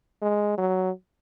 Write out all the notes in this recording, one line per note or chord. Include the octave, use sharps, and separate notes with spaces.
G#3
F#3